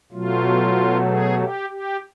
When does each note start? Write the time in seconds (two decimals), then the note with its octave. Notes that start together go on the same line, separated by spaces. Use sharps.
0.12 B2 F#3 A3 F4
1.07 G#4
1.38 G4
1.70 G4